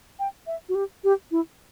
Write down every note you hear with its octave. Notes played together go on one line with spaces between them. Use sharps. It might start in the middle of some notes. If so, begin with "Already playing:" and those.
G5
E5
F#4
G4
G4
E4